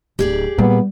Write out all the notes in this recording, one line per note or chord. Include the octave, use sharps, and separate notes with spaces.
D1 G4 G#4 D5
A#2 G3 B3